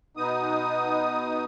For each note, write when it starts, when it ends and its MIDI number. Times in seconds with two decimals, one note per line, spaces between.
0.17 1.45 47
0.17 1.45 59
0.17 1.45 63
0.17 1.45 87